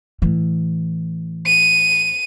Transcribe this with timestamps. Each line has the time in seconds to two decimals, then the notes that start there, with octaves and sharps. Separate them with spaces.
0.22 A2 E3
1.46 D#7